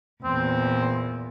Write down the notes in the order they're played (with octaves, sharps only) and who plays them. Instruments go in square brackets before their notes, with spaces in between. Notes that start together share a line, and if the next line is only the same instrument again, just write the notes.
[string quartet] E2 A#2 [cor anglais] C4